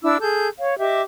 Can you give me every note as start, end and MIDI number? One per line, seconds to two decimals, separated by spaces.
0.02 0.17 62
0.02 0.17 64
0.02 0.17 86
0.02 0.17 88
0.21 0.46 68
0.21 0.46 69
0.21 0.46 91
0.58 0.77 73
0.58 0.77 77
0.79 1.01 67
0.79 1.01 75
0.79 1.01 76
0.79 1.01 86